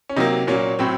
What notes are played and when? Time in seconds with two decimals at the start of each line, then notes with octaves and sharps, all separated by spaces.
0.09 C#4
0.16 C3 F#3 A#3 D#4
0.47 A#2 F#3 A#3 C#4
0.79 A2 F#3 C4